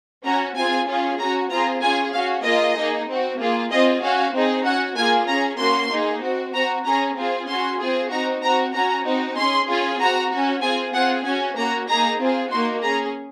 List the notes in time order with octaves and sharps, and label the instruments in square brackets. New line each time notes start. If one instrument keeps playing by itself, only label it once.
[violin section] C#4 F#4 A#5
C4 F4 G#4 G#5
C#4 F4 G#4
C#4 F#4 A#5
C4 F4 G#4 A#5
C#4 F4 G#4 G#5
C#4 F#4 F5
A#3 F4 G#4 D#5
A#3 D#4 G#4
C4 F#4
A#3 F4 G#4
C4 F4 G#4 D#5
C#4 F#4 F5
C4 D#4 G#4
C#4 F#4 F#5
A#3 F4 G#4 G#5
C#4 G#4 A#5
A#3 C#4 F#4 C6
A#3 D#4 G#4
C4 F#4
C4 F#4 A#5
C#4 G#4 A#5
C4 F4 G#4
C#4 F#4 C6
C4 F4 G#4
C4 D#4 F#4 A#5
C4 F#4 A#5
C#4 F#4 A#5
C4 D#4 F#4
C#4 G#4 C6
C#4 F4 G#4
C4 F#4 A#5
C#4 F#4
C4 F4 G#4 G#5
C4 F4 G#4 F#5
C#4 F#4 G#5
A#3 C#4 F#4 A#5
A#3 D#4 G#4 A#5
C4 F4 G#4
A#3 D#4 F#4 C6
C#4 G#4 A#5